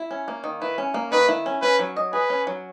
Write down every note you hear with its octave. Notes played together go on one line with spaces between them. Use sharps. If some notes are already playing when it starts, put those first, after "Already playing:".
Already playing: E4
C#4
A#3
D#3
E4 B4
C#4
A#3
D#3 B4
E4
C#4
C#4 B4
F#3
D#5
G#4 B4
C#4
F#3